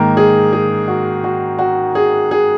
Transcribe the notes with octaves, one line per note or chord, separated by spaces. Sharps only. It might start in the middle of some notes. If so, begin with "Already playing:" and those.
Already playing: G#2 D#3 A#3 A#4
G#4
G#4
F#4
F#4
F#4
G#4
G#4